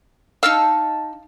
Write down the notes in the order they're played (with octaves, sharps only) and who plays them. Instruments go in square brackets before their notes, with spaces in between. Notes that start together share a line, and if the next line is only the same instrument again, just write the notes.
[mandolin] D#4 A5 E6 [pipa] F5